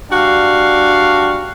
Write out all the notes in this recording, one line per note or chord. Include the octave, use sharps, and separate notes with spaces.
G3 D4 F#4 F5